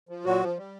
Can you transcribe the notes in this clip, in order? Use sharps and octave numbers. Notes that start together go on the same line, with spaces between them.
F3
A#2 F#3 F#4
F3
G3